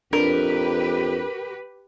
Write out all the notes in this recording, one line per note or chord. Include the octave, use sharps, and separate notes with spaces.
F2 D4 G4 A#4 B4